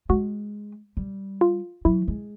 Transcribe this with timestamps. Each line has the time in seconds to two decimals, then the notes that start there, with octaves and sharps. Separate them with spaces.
0.09 G#3 F#4
0.97 G3
1.41 F4
1.85 F#3 E4
2.08 G#3